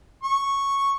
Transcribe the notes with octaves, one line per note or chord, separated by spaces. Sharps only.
C#6